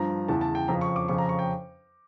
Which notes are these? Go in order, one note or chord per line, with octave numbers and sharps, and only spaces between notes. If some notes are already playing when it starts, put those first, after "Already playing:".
Already playing: G2 F3 A#5
E2 C#3 E3 A5
A5
G5
F2 C#3 F3 A#5
C#6
D6
F2 C#3 F3 C#6
A#5
C#6
G5